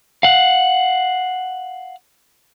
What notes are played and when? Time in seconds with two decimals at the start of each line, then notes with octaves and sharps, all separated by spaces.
0.23 F5 F#5